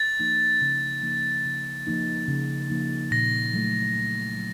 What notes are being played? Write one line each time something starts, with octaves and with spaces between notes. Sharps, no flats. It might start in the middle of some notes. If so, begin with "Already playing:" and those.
Already playing: A6
F3 A#3 D#4
C#3
F3 A#3 D#4
C#3
F3 A#3 D#4
C#3
F3 A#3 D#4
A#2 A#6
F#3 A3
A#2
F#3